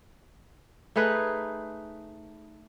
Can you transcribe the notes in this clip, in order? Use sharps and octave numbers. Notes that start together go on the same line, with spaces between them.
A3 D#4 G#4 B4